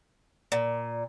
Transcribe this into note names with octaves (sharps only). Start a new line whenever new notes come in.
A#2